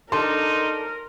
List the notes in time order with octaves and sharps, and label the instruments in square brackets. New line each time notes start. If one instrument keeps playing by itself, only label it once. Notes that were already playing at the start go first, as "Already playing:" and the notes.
[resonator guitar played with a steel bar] D4 A4 [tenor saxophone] D#4 [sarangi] A#4 [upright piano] C6